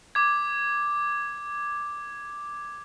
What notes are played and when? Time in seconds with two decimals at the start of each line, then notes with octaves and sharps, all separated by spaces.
0.15 D6 G#6